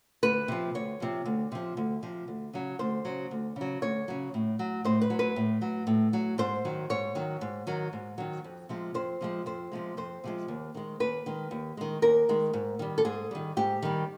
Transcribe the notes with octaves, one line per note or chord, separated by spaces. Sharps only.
D2 B4
C3 F3
D2 C#5
C3 F3
D2
C3 F3
D2
C3 F3
D2
C#3 F#3
D2 C5
C#3 F#3
D2
C#3 F#3
D2 C#5
C#3 F#3
A2
F#3
A2 C5
B4
F#3
B4
A2
F#3
A2
F#3
G#2 C5
D#3 F#3
G#2 C#5
D#3 F#3
G#2
D#3 F#3
G#2
D#3 F#3
F2
C3 F3 G#3
F2 C5
C3 F3 G#3
F2 C5
C3 F3 G#3
F2 C5
C3 F3 G#3
D#2
D#3 G#3
D#2 B4
D#3 G#3
D#2
D#3 G#3
D#2 A#4
D#3 G#3
G#2
D#3 G3
A4
G#2 G#4
D#3 G3
G#2 G4
D#3 G3